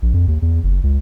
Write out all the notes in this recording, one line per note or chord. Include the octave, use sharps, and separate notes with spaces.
A#1
F2
D#2
E2
F#1
C#2